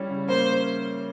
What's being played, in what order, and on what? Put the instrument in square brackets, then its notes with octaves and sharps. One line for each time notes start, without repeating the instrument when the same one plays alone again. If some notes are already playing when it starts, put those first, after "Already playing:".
Already playing: [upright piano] G3 C#4 E4
C#3
[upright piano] A#3 [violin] C5